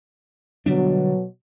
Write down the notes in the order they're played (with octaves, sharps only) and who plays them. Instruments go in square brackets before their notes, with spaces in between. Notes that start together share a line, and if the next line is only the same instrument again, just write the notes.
[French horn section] B2 F#3 [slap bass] D3 G3 D4